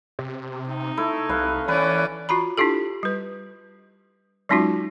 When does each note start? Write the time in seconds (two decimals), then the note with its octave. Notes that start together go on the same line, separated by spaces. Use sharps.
0.19 C3
0.68 D#4
0.97 A3 E4
1.29 C2 B4 F5
1.68 E3 C#4 B4 D5
2.29 F4 F#4 A#5 B5
2.58 D4 E4 F4 G4 A4
3.03 G3 B4
4.49 F#3 G#3 C#4 D#4 F4 F#4